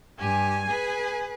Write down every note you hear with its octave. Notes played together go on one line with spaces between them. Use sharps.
G2 G4 G#5
G#4 B4